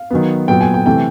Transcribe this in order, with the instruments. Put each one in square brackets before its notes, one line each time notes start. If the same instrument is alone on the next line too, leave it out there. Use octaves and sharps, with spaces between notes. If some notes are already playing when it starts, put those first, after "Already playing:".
Already playing: [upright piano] F5
D#3 F#3 B3
A#2 F#3 B3 G5
G#5
G5
C3 E3 A3 G5